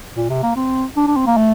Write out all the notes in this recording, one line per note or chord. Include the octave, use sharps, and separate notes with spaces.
A#2
C3
A#3
C4
D4
D4
C4
A#3
A3